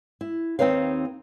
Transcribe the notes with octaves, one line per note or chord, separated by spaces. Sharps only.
E4
D#2 C4 D#4 B4 C#5 F5